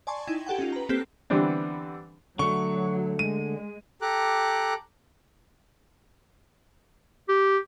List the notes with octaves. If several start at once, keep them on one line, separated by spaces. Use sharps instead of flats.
D5 G#5 A5 C6 C#6
D#4 E4 G5 G#6
G4 A4 F#5 G5
C#4 D#4 F4
B4 A#5
A#3 C4 G4 A4 F#6 B6
D3 E3 G3 B3 C4 D4
D3 F#3 A3 C#6
G#3 D#7
G4 A4 A#5 D6 F#6
G4